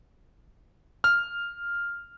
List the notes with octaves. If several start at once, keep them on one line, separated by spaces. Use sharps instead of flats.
F6